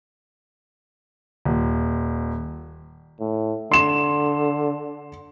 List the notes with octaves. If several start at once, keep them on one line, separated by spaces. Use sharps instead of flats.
D#1
A2
D3 C6 E7